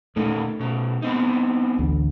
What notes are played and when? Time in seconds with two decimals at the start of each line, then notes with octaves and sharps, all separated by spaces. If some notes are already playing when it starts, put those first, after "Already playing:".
0.16 A#2 A3 C#4 D#4
0.60 B2 C#4
1.02 B3 C4 D#4
1.78 A1 D2 D3